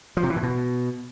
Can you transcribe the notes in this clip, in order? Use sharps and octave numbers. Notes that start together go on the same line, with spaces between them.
F3
C3
E3
A2
B2